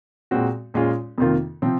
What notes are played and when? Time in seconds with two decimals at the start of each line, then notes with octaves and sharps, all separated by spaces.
0.31 A#2 G#3 C4 F#4
0.74 A#2 G#3 C#4 F4 G#4
1.18 F2 C3 D#3 A#3 F4
1.62 C3 F3 C4